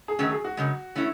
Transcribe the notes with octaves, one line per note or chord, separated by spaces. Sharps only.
G#4
D#3 F#3 A3 C#4 F#4
G#4
F#4
F#2 C#3 G#3
E3 A3 C#4 E4